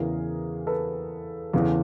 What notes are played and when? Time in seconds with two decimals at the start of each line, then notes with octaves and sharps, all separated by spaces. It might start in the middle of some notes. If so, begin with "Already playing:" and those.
Already playing: E2 C#3 E3 G#4 A#4
0.67 A4 B4
1.54 E2 C#3 E3